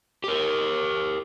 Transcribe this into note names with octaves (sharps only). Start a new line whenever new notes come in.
G4 A#4